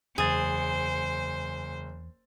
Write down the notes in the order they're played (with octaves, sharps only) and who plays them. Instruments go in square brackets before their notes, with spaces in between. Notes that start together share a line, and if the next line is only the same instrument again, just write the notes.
[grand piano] F#1 A6 [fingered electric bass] E2 [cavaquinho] G#4 [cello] C5